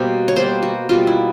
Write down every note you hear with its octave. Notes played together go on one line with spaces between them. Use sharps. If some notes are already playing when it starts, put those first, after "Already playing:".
Already playing: B2 G3 A#3 C5
C#5
B2 G3 A#3 C5
F#4
B2 G3 A#3 F4
E4